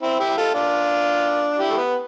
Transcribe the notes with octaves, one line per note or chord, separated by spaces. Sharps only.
C4 E4
E4 G4
F4 A4
D4 F4
E4 G4
A3
B3